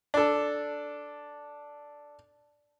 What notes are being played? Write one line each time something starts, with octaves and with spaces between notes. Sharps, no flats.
D4 A4